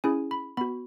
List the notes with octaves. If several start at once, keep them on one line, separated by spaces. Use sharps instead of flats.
C#4 E4 G#4 G#5
B5
B3 F#4 B5